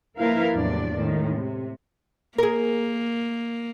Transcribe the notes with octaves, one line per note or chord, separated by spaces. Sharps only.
F3 A#3 E4 A#4 B4 F5
E2 A2 C3 F#3 D4 D5
A2 D#3 G#3
C3
A#3 G#4 A#4